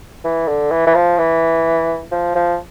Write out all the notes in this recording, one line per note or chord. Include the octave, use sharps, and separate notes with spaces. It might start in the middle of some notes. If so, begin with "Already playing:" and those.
E3
D3
E3
E3
F3
E3
F3
F3